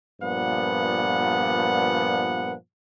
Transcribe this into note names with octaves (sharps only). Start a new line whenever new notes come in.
G2 A#2 F3 B3 F#5